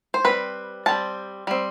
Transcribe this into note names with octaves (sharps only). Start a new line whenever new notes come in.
C5
G3 C4 B4
G3 C4 A5
G3 C4